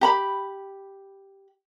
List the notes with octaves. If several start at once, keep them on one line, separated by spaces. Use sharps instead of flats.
G4 A#5 B5